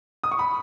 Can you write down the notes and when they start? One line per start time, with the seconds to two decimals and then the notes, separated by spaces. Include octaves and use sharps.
0.24 D#6
0.31 C#6
0.39 B5